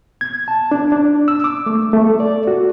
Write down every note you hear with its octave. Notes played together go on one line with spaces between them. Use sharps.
G#6
A5
D4
D4
E6
D6
A3
A3
A4
D5
F#4